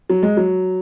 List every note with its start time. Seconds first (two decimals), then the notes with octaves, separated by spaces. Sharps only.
0.10 F#3
0.23 G#3
0.37 F#3